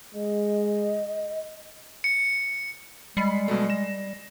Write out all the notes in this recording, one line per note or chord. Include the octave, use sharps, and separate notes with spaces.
G#3 D#5
C#7
G3 G#3 B5 C7 C#7
B2 F#3 A3
A#6 E7